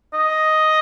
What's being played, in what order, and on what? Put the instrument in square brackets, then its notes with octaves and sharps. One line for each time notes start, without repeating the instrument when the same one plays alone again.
[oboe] D#5